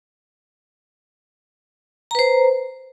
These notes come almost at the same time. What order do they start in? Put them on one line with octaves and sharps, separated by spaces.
A#5 B4 C5